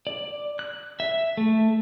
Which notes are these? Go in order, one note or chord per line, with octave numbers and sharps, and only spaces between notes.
D5
F#6
E5
A3